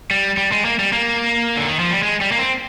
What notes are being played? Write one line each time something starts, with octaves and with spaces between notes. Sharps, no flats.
G3
G3
G#3
A#3
G3
A#3
D3
D#3
F3
G3
G#3
G3
A#3
C4